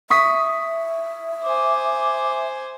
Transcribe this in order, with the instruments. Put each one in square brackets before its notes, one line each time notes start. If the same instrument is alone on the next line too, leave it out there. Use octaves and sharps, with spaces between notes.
[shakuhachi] E5 [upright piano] C#6 D#6 B6
[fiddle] C5 G#5 [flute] D6